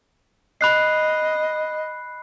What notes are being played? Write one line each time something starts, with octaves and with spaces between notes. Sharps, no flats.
D#5 B5 F#6 C7